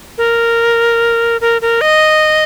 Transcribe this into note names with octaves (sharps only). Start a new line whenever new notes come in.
A#4
A#4
A#4
D#5